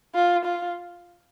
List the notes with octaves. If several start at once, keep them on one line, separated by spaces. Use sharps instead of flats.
F4
F4